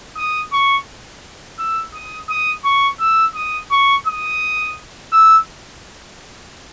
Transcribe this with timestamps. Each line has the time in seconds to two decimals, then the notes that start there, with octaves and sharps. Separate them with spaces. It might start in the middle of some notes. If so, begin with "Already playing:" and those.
0.17 D#6
0.52 C#6
1.59 E6
1.94 D#6
2.29 D#6
2.65 C#6
3.00 E6
3.35 D#6
3.71 C#6
4.07 D#6
5.13 E6